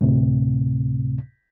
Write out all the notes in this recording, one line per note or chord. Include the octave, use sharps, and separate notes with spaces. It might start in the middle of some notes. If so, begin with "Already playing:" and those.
D2 A2 C3